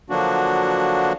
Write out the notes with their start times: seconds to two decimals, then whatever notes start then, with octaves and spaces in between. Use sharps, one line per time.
0.10 D3 F3 F#3 A#3 D4 F#4